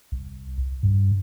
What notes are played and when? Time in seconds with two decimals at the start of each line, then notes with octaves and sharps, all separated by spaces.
0.12 C2
0.83 G2